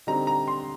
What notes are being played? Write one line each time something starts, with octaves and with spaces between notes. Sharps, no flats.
D3 G3 C4 D#4 A#5
A#5
C6